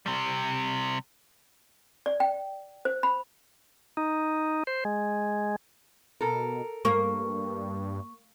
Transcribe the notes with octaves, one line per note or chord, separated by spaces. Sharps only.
C3 G3
D5
G5
C5
B5
D#4
C5
G#3
B2 A4 A#4
G2 A#3 C#6